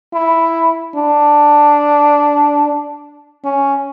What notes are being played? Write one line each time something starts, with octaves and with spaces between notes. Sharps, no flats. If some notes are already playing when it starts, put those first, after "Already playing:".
E4
D4
C#4